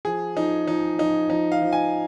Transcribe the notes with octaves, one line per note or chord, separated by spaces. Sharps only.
F3 G#4
F3 D#4
F3 D#4
F3 D#4
F3 D#4
F5
F3
G#5